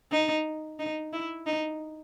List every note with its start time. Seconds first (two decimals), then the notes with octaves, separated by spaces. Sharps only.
0.12 D#4
0.79 D#4
1.13 E4
1.47 D#4